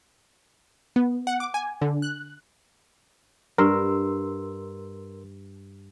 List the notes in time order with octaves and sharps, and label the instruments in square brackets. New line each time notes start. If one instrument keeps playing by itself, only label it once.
[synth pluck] B3
F#5
D6
G#5
D3
F#6
[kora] G2 [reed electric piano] A#4 C6 E6